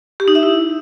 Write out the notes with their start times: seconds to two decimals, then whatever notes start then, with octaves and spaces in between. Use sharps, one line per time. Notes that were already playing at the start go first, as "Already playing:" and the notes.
0.20 G4
0.28 D#4
0.35 E5
0.43 E4